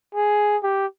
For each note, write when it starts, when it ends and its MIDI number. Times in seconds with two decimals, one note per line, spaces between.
0.15 0.57 68
0.63 0.86 67